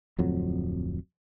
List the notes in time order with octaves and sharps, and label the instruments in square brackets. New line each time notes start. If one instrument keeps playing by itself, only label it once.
[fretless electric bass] D1 F2 F#3